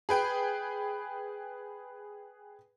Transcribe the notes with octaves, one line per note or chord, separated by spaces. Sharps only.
G#4 B4 G5